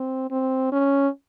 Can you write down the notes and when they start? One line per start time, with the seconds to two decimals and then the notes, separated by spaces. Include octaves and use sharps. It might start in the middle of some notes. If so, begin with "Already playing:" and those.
Already playing: C4
0.31 C4
0.72 C#4